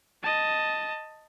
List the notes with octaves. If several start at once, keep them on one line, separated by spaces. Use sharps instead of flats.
D#5 A5